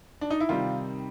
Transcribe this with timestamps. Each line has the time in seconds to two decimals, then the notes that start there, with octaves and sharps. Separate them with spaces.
0.21 D4
0.30 D#4
0.40 E4
0.49 C3 D#3 G3 F4